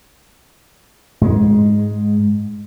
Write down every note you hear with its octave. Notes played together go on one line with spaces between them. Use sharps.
G#2 G#3